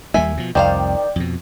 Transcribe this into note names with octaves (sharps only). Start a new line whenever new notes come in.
D#2 G3 A#3 E5 G#5
B2 F3
C2 F2 D#3 C5 D5 F5 G5
F2 B2